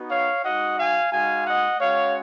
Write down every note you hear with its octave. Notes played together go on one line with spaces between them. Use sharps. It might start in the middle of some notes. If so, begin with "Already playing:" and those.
Already playing: B3 D#4 F#4
C#5 F5
G#3 D#4 F#4 D#5 F#5
F5 G#5
G#3 D#4 F#4 F5 G#5
D#5 F#5
G#3 C#4 F#4 C#5 F5